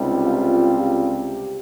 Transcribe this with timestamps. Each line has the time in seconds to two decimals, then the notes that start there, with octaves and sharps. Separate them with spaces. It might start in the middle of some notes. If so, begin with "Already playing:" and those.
Already playing: C#2 C3 G3 D#4
0.24 F4
0.80 G4